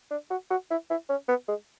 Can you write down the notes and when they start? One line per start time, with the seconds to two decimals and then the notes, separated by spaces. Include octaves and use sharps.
0.11 D4
0.30 F#4
0.51 F#4
0.70 E4
0.90 E4
1.09 C#4
1.28 B3
1.48 G#3